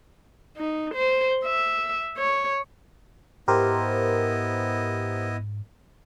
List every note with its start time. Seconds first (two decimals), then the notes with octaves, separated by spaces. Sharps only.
0.57 D#4
0.94 C5
1.44 E5
2.18 C#5
3.48 G#2 B3 E4 G4 A#4 C5 D#5